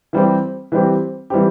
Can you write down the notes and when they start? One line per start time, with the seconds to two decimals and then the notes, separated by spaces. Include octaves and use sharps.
0.13 E3 G3 C4 G4
0.72 E3 G3 C4 G4
1.30 E3 G3 C4 G4